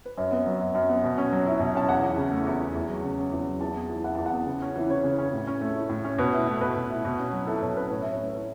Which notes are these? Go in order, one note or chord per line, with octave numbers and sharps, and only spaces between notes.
B4
F#2 C#5
B3
F#3
F#2
F#2
B3
B2
C#4
F#3
E4
B2
C#4 A5
E2 F#5
E3
C#3
A3
E2
E3
E2
F#3
C#3
C#4
E2
F#3
E2 A5
B3
E3
E4 F#5
E2 A5
F#5
B3
C#3
C#4
E3
C#3 C#5
C#3
C#4
A2
C#4
A3
E4
A2
C#4
B2 B4
E4
A3
B2 B4
B2
E4
B2
C#4
F#3
E4 A4
B2 C#5
C#4 B4
A2 C#5
C#4 E5
C#5
A3
E4 C#5